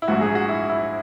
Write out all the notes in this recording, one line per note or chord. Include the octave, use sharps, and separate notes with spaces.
E4
A#1 G#2 F#3 F#4
G#4
F#4
E4
E4